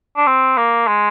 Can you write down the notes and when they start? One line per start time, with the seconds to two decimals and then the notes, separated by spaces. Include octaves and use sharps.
0.17 D4
0.27 C4
0.57 A#3
0.87 G#3